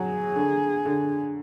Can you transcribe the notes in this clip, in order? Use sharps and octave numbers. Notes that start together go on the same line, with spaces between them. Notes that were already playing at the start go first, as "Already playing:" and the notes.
Already playing: F#3 G#4
D3
D3